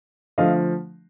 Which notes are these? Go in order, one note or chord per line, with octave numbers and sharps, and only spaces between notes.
D3 F3 A3 D#5 F5